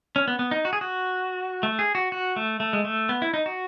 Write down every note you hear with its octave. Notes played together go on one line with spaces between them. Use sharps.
C#4
B3
B3
D#4
F#4
G#4
F#4
A3
G#4
F#4
F#4
A3
A3
G#3
A3
B3
E4
D#4
F#4